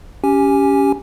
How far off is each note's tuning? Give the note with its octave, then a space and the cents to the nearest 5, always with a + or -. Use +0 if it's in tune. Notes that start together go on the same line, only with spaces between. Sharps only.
C#4 +15 G4 +0 G#5 +0